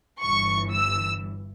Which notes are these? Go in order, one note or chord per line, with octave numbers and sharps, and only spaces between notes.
G1 G2 E3 C#6
E6